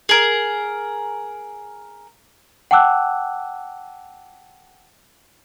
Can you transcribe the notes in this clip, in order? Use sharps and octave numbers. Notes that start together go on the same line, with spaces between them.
G#4 A#4
F#5 G5 A5 D6 E6 F#6